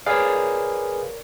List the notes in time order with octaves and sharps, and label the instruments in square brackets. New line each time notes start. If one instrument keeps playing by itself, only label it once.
[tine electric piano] G#4 B4 F5 [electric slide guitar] A#4 C#5 D5